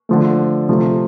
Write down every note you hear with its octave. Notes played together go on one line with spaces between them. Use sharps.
D3 F3 A3
C3 F3 A3